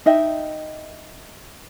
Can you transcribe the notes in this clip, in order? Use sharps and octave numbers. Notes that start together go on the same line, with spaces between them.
D#4 D#5 E5 G5